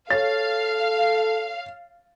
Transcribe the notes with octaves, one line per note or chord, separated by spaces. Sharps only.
A4 C#5 F5 A6